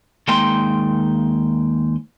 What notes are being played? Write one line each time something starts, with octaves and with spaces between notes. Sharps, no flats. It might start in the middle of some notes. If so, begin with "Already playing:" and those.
D#2 G#3 A#3 D#4 G5 C6